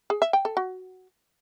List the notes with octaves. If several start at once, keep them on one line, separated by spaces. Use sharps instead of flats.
G#4
E5
G5
A4
F#4